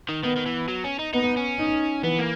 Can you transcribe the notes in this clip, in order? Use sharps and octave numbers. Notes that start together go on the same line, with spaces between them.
D#3
D#3 B3
D#3
E3
F#3
C#4
D#4
B3 D#4
C#4
D#4
E3 B3
A#3